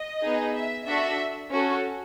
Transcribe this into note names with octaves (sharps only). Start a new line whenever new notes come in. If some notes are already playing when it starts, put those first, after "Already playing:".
Already playing: D#5
B3 D#4 G#4
E5
D4 F#4 A4 E5
C#4 F#4 A4